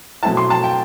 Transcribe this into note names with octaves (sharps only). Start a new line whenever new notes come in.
B2 F#3 A3 C4 E4 A5
C6
A5
G5